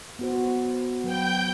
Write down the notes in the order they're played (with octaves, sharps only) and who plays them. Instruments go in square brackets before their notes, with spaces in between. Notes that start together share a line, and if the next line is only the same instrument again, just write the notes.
[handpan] B3 F#4 C5
[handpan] F#3 B4 [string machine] G5 G6